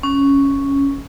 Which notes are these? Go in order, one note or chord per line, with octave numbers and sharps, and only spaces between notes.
C#4